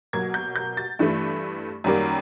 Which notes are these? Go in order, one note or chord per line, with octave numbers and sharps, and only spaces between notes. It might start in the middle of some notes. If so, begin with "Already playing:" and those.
B2 F#3 A#3 G#6
G6
G6
A6
G2 E3 A3
F#2 D#3 G3 A#3